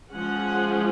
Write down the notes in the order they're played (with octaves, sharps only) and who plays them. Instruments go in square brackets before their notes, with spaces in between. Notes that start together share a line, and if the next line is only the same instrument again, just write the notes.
[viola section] F3 G#3 C#4 F#5